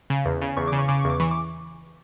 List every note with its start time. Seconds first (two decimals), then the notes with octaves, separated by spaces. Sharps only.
0.10 C#3
0.25 E2
0.41 C#3
0.57 E2 C#6
0.68 C#3 D6
0.78 C#6
0.88 C#3 D6
0.99 C#6
1.04 E2
1.09 D6
1.20 E3 C#6
1.31 D6